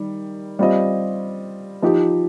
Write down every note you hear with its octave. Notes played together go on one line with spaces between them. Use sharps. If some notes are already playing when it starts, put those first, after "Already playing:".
Already playing: D#3 G3
G3 C4 F4 D#5
F3 D#4 G4